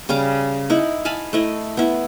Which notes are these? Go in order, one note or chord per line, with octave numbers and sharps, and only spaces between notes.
C#3 G3 F5 D6
D#4 E4 F#5
F5 G#5 A5 B5
A3 E4 D#5
B3 E4